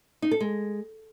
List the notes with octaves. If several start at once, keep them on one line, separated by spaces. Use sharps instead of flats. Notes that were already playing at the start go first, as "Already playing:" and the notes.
D#4
A4
G#3